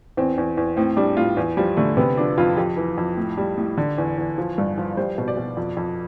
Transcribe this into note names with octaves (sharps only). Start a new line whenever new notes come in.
E2 C4
E2
E2
A2 C4
G3 D4
A2 F4
E2
F3 G3
D3 A3
C3 B3
F3 D4
F2 F4
F2 G4
E3
F2
A2
G3
A2
D3
E2
E2
F3
G2
F3
G3 C5
B2
D5
B2
F2
F2